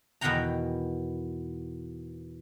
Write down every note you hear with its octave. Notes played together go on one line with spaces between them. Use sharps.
E2 B2 D#3 F#5 G5 A#5